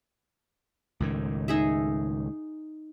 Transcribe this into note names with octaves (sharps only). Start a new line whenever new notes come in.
C#2 A2 D#3
D#4 G#4 E5